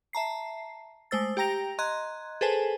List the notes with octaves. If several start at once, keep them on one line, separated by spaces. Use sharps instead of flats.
E5 A5 A#5 C7
G#3 A3 C5 E6 A6
G4 G5 A#5 A#6 F7
D#5 A#5 C6 F#6 G#6
G#4 A4 B4 C5 G#5 A5